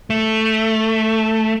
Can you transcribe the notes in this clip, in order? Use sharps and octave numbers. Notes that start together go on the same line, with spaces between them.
A3